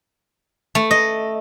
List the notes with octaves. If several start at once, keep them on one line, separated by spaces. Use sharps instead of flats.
A3
D#5